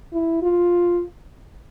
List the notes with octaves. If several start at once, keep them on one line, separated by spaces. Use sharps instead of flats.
E4
F4